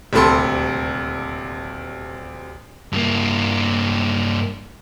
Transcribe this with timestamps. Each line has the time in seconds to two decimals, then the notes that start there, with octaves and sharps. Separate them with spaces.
0.13 D#1 D2 C3 A4 B5 C6
2.93 G2 A#3